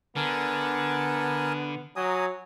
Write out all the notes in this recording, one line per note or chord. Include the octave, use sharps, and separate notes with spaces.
D3 B3 A#4 G#5 A5
F#3 G#5 A#5 D#6